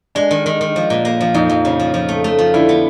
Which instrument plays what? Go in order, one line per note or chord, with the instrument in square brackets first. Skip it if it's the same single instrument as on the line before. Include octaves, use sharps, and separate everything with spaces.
[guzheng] G#3 [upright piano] D4
[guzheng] D#3
D#3
D#3
F3
A#2
A#3
F3
[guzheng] F2 [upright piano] D#4
[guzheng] F2
C#3
F3
F3
A3
A3
F3
[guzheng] D3 [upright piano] E4
[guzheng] B3